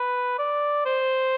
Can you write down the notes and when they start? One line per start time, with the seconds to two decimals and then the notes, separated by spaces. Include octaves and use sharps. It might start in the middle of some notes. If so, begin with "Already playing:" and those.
Already playing: B4
0.39 D5
0.86 C5